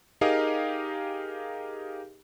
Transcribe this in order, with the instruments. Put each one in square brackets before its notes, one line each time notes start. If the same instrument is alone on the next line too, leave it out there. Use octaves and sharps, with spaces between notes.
[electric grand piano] D#4 G4 G#4 A#4 D#5 F5